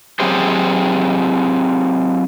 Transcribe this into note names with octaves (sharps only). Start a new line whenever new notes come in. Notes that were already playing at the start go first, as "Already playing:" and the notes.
F#3 C4 G4 G#4 C5